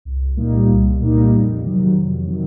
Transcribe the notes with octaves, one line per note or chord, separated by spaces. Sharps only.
C2
A#2 G3 A#3 D#4
C2
A#2 G3 A#3 D#4
F2
C3 D#3 F#3
F2
C3 D#3 F#3